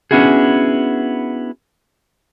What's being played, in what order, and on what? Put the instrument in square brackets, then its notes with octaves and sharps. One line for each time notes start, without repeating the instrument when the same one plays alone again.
[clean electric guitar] B3 C#4 D4 E4 F#4 G#4